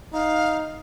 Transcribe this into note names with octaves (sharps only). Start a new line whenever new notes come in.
D#4 F5